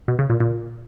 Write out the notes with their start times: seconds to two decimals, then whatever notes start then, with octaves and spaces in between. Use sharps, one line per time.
0.08 B2
0.19 C#3
0.30 A#2
0.40 A#2